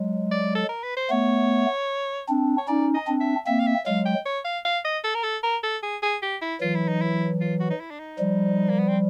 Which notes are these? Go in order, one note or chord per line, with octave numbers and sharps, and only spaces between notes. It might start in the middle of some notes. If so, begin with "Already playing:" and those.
Already playing: F#3 G#3
D5
A4
A#4
B4
C5
A3 B3 C#5
C4 D4
C#5
C#4 D#4 D5
D#5
C4 D4
E5
A#3 C4 E5
F5
E5
F#3 G#3 F5
G5
C#5
F5
F5
D#5
A4
A#4
A4
A#4
A4
G#4
G#4
G4
E4
E3 F#3 F4
E4
D#4
E4
F4
F#4
D#4
E4
D4
D#4
F3 G3
A#3
B3
C4